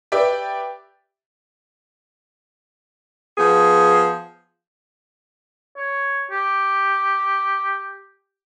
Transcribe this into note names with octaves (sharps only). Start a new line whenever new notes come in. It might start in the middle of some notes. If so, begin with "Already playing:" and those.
G4 B4 D5 E5 G5
F3 B3 G#4
C#5
G4